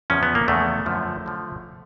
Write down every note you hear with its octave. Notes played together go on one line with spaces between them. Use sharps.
E2 C#3 F3 C#4
B3
A#3
E2 C#3 F3 A3
F#2 D3 F3
D3 F3